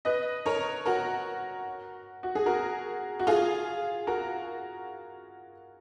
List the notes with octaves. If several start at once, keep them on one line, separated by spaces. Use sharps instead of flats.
B4 D#5
A#4 C#5
F#4 A#4
F#4
G#4
F#4 A#4
F#4
F4 G#4
F#4 A#4